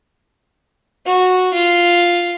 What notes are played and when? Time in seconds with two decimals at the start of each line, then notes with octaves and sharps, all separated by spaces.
1.06 F#4
1.54 F4